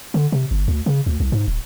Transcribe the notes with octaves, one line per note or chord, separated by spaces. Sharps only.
D3
C3
G1
D2
C#3
D2
C2
G#2
D1